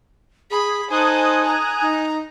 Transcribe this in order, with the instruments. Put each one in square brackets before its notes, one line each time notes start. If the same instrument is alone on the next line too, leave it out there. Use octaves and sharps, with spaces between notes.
[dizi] G#4 [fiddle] B5
[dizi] D#4 [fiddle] A4 C5 [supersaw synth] G#5 D#6 F#6
[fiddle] A#5
[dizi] D#4